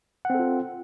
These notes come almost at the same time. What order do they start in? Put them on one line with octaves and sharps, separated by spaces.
F#5 C4 A4 F4